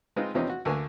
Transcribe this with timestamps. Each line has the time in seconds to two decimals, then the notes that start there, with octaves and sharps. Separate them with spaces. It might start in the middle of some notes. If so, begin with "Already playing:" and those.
0.16 G#3 C4 D#4 F4 B4
0.34 E2 C3 F3 C4 C#4 D#4
0.49 F#4
0.65 D2 D3 A#3 G#5